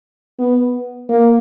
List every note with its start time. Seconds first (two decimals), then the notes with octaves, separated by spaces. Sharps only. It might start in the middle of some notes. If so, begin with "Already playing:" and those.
0.39 B3
1.09 A#3